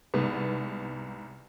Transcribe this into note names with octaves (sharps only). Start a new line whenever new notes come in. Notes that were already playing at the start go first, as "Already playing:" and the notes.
C2 G#2 B3